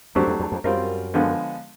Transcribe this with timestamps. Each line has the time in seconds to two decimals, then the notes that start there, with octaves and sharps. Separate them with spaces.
0.15 F2 F#3 A3 D4 G4 C5
0.27 F2
0.40 E2
0.52 F2
0.64 F#2 G3 C4 F4 A#4
1.14 D3 F3 G#3 B3